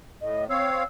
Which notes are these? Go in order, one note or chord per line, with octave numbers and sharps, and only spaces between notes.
A2 D#5
C4 C#5 F5 E6